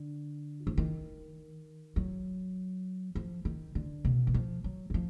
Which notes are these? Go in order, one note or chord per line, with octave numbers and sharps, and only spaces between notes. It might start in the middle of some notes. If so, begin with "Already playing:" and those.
Already playing: D3
F3
D#3
F#3
F3
D#3
D3
B2
D#3
F3
F#3
D#3
F3